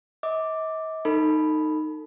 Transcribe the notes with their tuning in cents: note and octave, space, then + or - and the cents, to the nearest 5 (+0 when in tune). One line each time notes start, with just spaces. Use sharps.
D#5 +45 D6 +0
D#4 -10 A4 +30 B5 +0